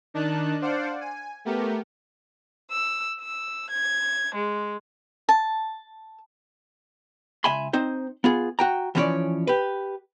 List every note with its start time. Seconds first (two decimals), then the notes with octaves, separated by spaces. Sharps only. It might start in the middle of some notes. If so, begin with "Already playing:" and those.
0.14 D#3 D4 D#4 A5 F#6
0.61 D4 C5 D5 F5 F#5
1.01 G#5
1.45 A3 B3 G4 A#4
2.71 E6
3.20 E6
3.70 G#6
4.34 G#3
5.29 A5
7.44 C#2 E5 G#5 B5 C6
7.73 C4 D#4 C5
8.24 B3 F4 G#4
8.59 F#4 G5 A#5
8.95 E3 F3 C#4 F4 C#5 D5
9.47 G4 B4